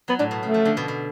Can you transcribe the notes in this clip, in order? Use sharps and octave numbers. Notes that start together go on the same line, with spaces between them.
F#3 B3
A2 D4
B2
C#3 A3
F3
D3
B2
B2